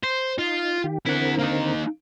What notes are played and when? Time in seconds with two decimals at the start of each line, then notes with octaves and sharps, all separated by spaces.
0.04 C5
0.39 D#4 F4
0.84 D#3 G4
1.06 D3 C4 E4 A#4 F#5
1.39 A#3 D#4